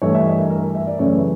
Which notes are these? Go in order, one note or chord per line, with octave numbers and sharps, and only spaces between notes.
G2 E3 A3 C#5
E5
D#5
A#4
A#4
E5
D5
F#2 C#3 E3 A3 C#5
B4